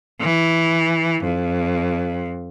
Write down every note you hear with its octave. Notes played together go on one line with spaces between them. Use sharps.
E3
F2